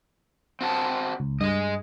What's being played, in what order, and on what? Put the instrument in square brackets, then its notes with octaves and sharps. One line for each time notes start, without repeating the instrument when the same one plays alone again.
[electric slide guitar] C4 F#4 A5
[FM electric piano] C#2
[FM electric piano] G2 [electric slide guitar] G#4 D#5